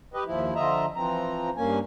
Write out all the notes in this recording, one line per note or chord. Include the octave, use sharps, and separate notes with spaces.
G4 B4 D#5
D#2 F3 E4
D3 F3 F4 D#5 E5 A#5
E3 F3 C4 A#5
G2 A#3 C#4 G#5